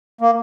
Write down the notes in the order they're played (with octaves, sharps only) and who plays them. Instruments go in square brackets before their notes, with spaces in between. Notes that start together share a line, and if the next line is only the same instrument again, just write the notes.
[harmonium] A#3